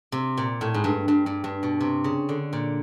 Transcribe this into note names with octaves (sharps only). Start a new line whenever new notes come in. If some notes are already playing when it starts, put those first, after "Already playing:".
C3
A#2
A2
G#2
G2
G2
G2
G2
B2
C3
C#3
D3
A#2